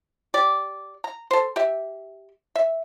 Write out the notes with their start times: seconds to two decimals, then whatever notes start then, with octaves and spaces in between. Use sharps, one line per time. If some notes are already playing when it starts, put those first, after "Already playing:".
0.34 G4 D5
1.04 A#5
1.31 A4 C5
1.56 G4 E5
2.56 E5